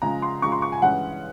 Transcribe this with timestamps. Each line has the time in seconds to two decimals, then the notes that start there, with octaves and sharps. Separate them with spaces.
0.02 C#3 F3 G#3 A#5
0.22 C6
0.42 C#3 F3 G#3 C#6
0.52 C6
0.62 C#6
0.72 G#5
0.82 G2 E3 G#3 C#4 F#5